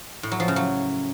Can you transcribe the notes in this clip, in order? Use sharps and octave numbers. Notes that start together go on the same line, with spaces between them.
A2
F#3
F3
C#3
F#3